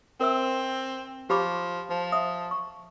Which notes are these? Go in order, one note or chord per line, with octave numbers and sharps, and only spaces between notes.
C4 A#4 E5 E6
F3 G4 B5 D6
F3
E5 D#6
C#6